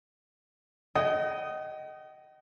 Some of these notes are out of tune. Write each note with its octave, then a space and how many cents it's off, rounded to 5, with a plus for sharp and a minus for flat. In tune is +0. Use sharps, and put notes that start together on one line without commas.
D#5 +0 G5 -45